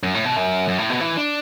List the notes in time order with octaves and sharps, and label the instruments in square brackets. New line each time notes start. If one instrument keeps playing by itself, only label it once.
[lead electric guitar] F#2
A2
B2
F#2
F#2
A2
B2
E3
D4